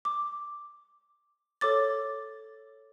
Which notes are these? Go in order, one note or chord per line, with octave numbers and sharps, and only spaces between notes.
D6
A4 C#5 D6 A6